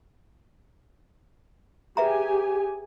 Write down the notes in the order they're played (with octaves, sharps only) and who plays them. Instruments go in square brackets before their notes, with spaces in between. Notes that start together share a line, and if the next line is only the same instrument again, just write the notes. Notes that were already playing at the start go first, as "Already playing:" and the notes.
[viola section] G4 G#4 G#5 [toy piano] B4 E5 A#5